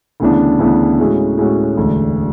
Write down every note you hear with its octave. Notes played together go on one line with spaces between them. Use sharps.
D2 C#3 E3 B3 D4
D2 C#3 E3 B3 D4
A2 G#3 C#4 F#4
A2 G#3 C#4 F#4
E1 D2 D3